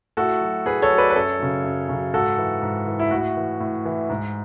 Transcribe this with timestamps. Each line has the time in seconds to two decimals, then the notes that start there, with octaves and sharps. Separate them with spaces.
0.17 A2 F#4 A4
0.41 F#3
0.66 A2 G#4 B4
0.82 A4 C#5
0.91 F#3
0.98 B4 D5
1.10 B4
1.15 F#2 A4 C#5
1.39 C#3 F#3
1.64 F#2
1.89 C#3 F#3
2.14 G#2 F#4 A4
2.38 E3
2.62 G#2
2.87 E3
2.99 E4
3.11 A2 F#4
3.37 E3
3.60 A2
3.86 E3
4.09 G#2